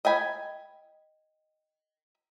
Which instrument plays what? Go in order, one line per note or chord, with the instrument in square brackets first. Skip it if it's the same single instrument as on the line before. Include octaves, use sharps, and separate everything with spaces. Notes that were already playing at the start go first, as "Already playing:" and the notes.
[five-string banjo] D#5 G5 G#5 B5